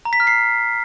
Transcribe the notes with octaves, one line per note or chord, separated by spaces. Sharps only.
A#5
B6
F6
C7